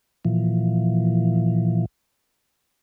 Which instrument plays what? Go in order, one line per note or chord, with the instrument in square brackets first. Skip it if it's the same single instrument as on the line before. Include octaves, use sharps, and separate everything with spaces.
[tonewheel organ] A#2 E3 F3